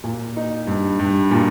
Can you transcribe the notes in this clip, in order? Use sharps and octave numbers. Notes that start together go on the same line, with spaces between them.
A#2
D#4
G2
G2
A#2